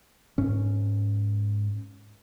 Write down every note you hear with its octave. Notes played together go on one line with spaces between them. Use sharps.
G#2 C#4